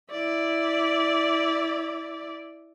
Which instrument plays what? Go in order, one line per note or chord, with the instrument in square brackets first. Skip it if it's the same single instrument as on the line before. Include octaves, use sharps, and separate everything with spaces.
[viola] E4 D5